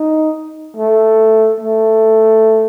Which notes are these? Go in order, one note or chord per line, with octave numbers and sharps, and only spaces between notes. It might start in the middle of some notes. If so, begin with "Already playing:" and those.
Already playing: D#4
A3
A3